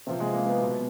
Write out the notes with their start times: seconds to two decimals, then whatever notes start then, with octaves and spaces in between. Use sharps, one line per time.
0.07 C3 A#3
0.09 F3
0.20 G#3
0.34 A#3
0.46 B3
0.60 B2 F#3